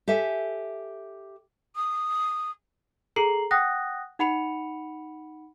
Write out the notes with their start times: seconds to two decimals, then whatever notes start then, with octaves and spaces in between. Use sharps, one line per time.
0.08 G4 A4 E5 G#5
1.75 D#6
3.16 G#4 A4 A#5 C7 F#7
3.51 F#5 G5 D#6 F#6 A#6
4.19 D#4 F#5 B5 C#7 F7